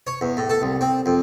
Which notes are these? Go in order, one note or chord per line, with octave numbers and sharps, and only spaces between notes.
C#5
E2
A2
A4
C2
C4
F2